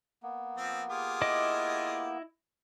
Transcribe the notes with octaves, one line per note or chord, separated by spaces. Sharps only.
A#3 B3
F3 C4
F4 G4 G#4
E4 D#5 D6